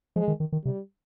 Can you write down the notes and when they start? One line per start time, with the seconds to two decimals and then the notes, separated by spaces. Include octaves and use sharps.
0.16 F3 G#3
0.28 D#3
0.40 D#3
0.52 D#3
0.65 C3 G3